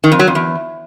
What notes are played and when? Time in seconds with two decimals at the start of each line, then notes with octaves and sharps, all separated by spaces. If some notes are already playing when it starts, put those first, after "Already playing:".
0.04 D#3
0.12 F2
0.19 F#3
0.27 F2
0.35 E2